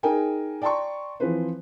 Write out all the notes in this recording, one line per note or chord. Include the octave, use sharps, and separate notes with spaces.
D#4 G#4 A#4 G5 G#5
D5 G5 A5 A#5 C6 C#6
E3 F3 C4 B4 C5